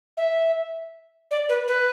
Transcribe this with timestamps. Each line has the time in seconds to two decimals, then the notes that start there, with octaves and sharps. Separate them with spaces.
0.17 E5
1.31 D5
1.49 B4
1.68 B4